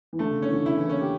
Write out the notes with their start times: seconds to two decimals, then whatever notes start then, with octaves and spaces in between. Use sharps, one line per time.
0.13 E3
0.19 D3 A3
0.31 C#3
0.42 D3 C#4
0.49 E3
0.54 D3
0.66 C#3 E4
0.77 E3
0.88 A#3 C#4
1.00 G4